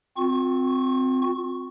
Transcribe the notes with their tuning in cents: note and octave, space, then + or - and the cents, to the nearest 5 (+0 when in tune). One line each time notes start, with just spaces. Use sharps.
C4 -10 F4 +40 C#6 +0